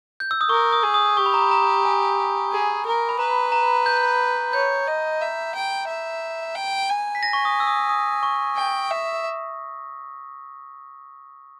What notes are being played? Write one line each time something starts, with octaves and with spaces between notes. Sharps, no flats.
G6
E6
D#6
A#4 C#6
D#6
G#4
D#6
G4 C#6
B5
A#5
B5
A#5
G#5
G#4
A#4
B5
B4 A#5
A#5
G6
C#5 G6
D#5
E5
G5
E5
G5
G#5
B6
A#6
C#6
D#6
E6
D#6
D#6
C#6
G5
E5